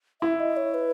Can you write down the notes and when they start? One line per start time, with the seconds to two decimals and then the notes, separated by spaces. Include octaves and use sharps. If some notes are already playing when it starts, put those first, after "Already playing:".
0.21 E4 E5
0.40 D#5
0.57 C#5
0.74 B4